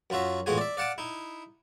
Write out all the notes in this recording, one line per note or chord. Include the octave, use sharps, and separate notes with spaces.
F#2 F#3 F4 F#4 E5
E2 A2 G#3 F4 F#4 G#5
D5 E5
D5 F5 F#5 A5 D6
D#4 E4